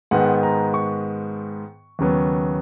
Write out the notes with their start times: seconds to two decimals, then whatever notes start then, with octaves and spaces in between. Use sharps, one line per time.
0.11 G#2 D#3 G#3 B3 F#5
0.43 A#5
0.74 C#6
1.99 D#2 C#3 F#3 B3